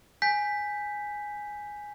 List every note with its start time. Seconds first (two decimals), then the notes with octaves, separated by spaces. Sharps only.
0.22 G#5 G6 B6